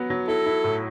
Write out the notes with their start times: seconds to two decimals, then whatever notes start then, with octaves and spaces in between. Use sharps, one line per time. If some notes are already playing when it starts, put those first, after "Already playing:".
Already playing: F#3 B3
0.10 F#3
0.28 E4 A4
0.46 E4
0.64 A2